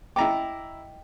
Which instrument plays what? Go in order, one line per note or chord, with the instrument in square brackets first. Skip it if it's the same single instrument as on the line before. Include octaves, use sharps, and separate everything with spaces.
[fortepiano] E4 A#5 D6 [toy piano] D#5 G5